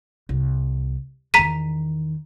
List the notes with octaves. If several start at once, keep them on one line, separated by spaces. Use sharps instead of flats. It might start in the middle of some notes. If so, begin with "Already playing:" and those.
C2
E2 D#3 A#5 B6 D#7